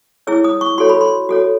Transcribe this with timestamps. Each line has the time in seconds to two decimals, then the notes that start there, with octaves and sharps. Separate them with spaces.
0.27 E4 G#4 C#5 E6
0.44 D#6
0.61 C#6
0.78 F#4 A4 C#5 C6
0.89 B5
1.01 C6
1.29 F#4 A4 C#5